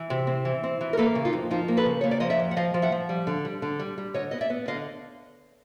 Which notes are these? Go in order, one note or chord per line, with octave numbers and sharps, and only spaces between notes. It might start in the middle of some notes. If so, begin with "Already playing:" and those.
Already playing: E3
C3
C4
E3
C4
E3
A#4
A#3 A4 B4
C#3
D#4 F4
F2
F3 D#4 F4
A#3
A4 B4
C#3
A#3 C#5
D5
F3 D#5
D5 E5
F2
F#5
F3 D#5 F5
F3
E5 F#5
F3
G3
D3
G3
D3
G3
G3
D3 C#5 D#5
B3 D#5
D5 E5
B3
D3 D#5 F5